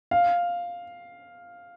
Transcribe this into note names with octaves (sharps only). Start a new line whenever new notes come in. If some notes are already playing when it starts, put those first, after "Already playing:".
F5